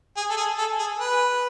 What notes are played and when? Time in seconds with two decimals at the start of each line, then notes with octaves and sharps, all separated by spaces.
0.17 G#4
0.30 A4
0.37 G#4
0.58 A4
0.79 G#4
1.00 B4